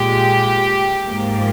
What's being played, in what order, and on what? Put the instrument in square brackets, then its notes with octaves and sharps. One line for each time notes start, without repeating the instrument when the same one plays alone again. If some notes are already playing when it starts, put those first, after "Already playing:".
Already playing: [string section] A#2 G#3 G4
G#2 F3 A#3